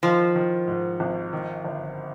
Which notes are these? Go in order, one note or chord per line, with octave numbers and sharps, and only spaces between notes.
D#3 F3
D#3
G#2
G#1
D#3
G1